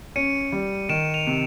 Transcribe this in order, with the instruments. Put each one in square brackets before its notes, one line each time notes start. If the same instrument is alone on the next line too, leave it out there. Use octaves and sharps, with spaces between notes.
[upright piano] C#4 [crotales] C#7 D#7
[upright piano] G3
[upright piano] D#3 [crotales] D7 E7
[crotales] D#7 F7
[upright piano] C3